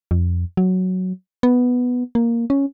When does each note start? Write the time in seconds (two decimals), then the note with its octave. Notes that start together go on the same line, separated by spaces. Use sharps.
0.11 F2
0.57 F#3
1.43 B3
2.15 A#3
2.50 C#4